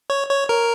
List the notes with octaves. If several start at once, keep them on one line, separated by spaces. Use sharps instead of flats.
C#5
C#5
A#4